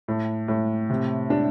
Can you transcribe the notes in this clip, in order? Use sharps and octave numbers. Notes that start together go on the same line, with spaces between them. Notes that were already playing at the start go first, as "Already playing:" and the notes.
A2
A2
C3
D4